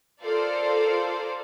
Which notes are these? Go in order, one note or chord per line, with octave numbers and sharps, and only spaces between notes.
F4 A4 A#4 C5 D5 F5